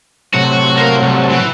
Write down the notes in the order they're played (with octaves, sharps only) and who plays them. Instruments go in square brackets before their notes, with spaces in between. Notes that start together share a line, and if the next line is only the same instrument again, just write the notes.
[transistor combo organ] A2 C3 F#3 [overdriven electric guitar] F#4
[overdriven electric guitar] A#4 F5
C2
E3